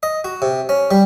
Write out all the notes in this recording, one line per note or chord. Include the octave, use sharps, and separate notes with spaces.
D#5
F#4
C3
C#4
G3